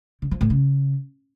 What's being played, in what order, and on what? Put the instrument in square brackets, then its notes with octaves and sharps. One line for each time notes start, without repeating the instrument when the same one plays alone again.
[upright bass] D3
F3
A2
C#3